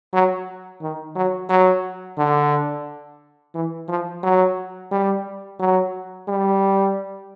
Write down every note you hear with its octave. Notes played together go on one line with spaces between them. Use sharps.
F#3
D#3
F#3
F#3
D3
E3
F3
F#3
G3
F#3
G3